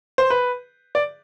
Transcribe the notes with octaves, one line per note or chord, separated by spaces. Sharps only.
C5
B4
D5